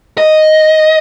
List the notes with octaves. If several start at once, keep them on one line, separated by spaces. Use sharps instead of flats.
D#5